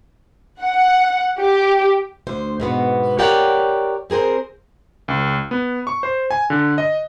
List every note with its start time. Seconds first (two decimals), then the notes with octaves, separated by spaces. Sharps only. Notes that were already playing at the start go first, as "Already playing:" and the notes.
0.61 F#5
1.40 G4
2.27 D2 C5
2.60 G#2 B2 B3
3.19 G4 A#4 C#5 D5 F#5 G5
4.10 C4 G#4 A#4 C5
5.08 C#2
5.51 B3
5.87 C#6
6.03 C5
6.31 G#5
6.50 D3
6.78 D#5